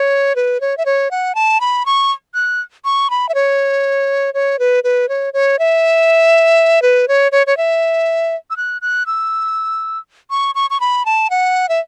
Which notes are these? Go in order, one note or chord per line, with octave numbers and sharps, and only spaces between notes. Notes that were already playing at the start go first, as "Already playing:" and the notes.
Already playing: C#5
B4
C#5
E5
C#5
F#5
A5
B5
C#6
F#6
C#6
B5
E5
C#5
C#5
B4
B4
C#5
C#5
E5
B4
C#5
C#5
C#5
E5
E6
F#6
F#6
E6
C#6
C#6
C#6
B5
A5
F#5
E5